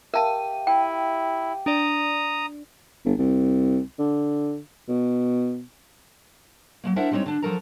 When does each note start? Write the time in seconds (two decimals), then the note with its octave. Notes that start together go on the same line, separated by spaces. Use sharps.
0.14 G4 A#4 E5 F5 A5 D#7
0.67 E4 G5
1.66 D4 D5 A#5 D#6
3.05 G1
3.19 C2
3.99 D3
4.89 B2
6.84 F#3 G#3 A#3
6.96 D4 E4 A#4 C5 E5 F#5
7.11 G3 G#3 C4 D#4 C#5
7.26 D3 D4
7.42 F3 F#3 A4 A#4 A5 A#5